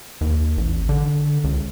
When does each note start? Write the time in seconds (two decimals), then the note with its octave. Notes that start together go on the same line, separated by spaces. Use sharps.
0.21 D#2
0.58 A1
0.89 D3
1.44 C#2